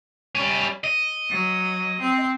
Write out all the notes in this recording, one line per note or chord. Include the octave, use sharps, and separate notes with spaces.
G3 C#4
D#5
F#3
C4